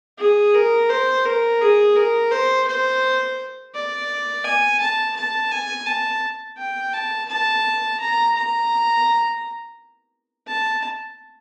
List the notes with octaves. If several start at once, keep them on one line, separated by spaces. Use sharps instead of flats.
G#4
A#4
C5
A#4
G#4
A#4
C5
C5
D5
G#5
A5
A5
G#5
A5
G5
A5
A5
A#5
A#5
A5